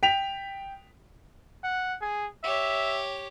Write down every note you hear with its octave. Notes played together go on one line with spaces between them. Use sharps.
G5 B6 F7
F#5
G#4
G4 C#5 E5